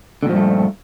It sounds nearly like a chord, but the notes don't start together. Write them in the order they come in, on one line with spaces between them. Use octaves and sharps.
D3 A#2 F3 G2 A3